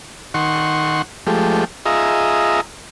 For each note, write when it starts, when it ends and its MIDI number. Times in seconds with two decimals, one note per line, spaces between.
0.34 1.02 51
0.34 1.02 78
0.34 1.02 84
0.34 1.02 85
1.27 1.64 53
1.27 1.64 56
1.27 1.64 57
1.27 1.64 67
1.86 2.61 65
1.86 2.61 68
1.86 2.61 75
1.86 2.61 76
1.86 2.61 82